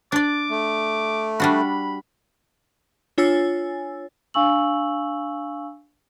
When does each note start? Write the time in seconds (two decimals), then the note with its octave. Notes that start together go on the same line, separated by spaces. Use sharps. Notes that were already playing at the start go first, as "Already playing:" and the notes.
0.12 D4 D5 D6
0.50 A3
1.40 G3 D4 F#4 B5
3.18 D4 F4 C#5 G#5 E6 A6
4.34 D4 F5 G#5 C#6 E6 F#7